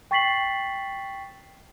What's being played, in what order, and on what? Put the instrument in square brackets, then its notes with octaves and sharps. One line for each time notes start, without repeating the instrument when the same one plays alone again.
[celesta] G5 C#6 A6 B6 C7 F#7